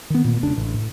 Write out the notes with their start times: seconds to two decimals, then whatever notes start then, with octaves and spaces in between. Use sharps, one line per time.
0.10 D#3 B3
0.24 A#2 A#3
0.43 E1 C#2 C#3 D4
0.56 A1
0.74 A2